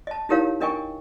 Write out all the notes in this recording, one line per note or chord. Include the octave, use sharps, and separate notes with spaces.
D#5 A5
D#4 E4 G4 A#4 C#5 F5
D4 A#4 D#5 G5 G#5 C#6